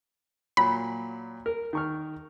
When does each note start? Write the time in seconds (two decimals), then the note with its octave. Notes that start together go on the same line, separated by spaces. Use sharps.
0.57 A#2 F#3 B5
1.46 A#4
1.73 D#3 C#6 F6